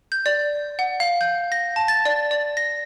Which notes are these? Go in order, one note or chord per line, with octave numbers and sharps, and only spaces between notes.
G6
D5
F#5
F5
G6
A#6
A5
A6
D5
D5
A#6